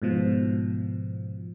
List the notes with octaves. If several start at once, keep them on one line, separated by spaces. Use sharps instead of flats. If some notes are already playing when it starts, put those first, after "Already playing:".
G#2 B2 F3